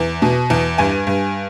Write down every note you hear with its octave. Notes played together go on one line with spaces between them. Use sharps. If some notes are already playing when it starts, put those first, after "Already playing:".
Already playing: E2
B2
E2
G2 G#5
G2